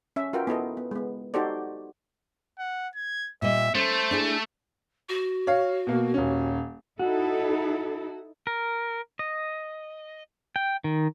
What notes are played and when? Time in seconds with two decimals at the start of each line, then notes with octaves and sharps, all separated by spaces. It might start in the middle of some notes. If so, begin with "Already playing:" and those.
0.16 C#4 E5
0.33 F4 F#4 A#4 B4 G5
0.47 B3 E4 A4 D#5
0.77 B3
0.91 G#3 B3
1.34 D#4 F#4 G4 A4 C5 D5
2.59 F#5
2.95 G#6
3.42 A#2 G3 D#5 E5
3.75 A3 C#4 C5
4.11 D4 E4 G#4
5.09 F#4
5.47 C#5 F5
5.87 B2 A#3
6.14 D#1 C#4
6.99 D#4 E4 F#4 A4
8.47 A#4
9.19 D#5
10.56 G5
10.84 D#3